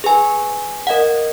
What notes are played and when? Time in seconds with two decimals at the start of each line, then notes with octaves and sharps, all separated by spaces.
0.04 G#4 B4 G#5
0.87 A#4 D#5 F5 F#5